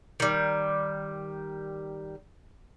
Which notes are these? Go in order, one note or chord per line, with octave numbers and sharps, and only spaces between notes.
D#3 G3